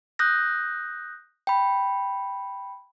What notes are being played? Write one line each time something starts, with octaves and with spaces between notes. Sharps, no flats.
D#6 F#6 G6 A#6
G5 B5